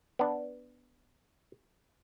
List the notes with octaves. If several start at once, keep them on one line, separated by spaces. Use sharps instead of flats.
B3 D4